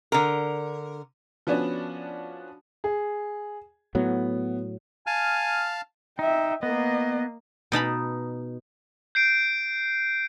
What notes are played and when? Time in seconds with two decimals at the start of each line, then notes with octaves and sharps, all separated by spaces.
0.12 D3 A#4
1.47 F3 B3 C#4 D4 F#4
2.84 G#4
3.95 A2 F#3 B3
5.07 F5 G#5 A5 F6
6.19 D#4 E5 G5
6.63 A#3 B3 D#5
7.72 B2 D#4 A5 B5
9.15 G6 C7 D7